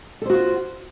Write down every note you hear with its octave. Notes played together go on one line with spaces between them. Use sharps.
F4 F#4 A4 C5